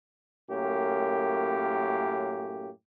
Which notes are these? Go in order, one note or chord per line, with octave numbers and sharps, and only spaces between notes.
F#2 A2 A#3 C#4 G4